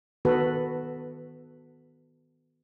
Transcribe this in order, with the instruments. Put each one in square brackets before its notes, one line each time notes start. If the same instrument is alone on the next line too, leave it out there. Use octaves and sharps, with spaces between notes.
[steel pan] D#3 B3 F#4 A4 B4